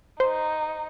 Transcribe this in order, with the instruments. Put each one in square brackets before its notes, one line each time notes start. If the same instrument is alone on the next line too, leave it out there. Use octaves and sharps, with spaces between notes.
[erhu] D#4 [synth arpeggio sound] C5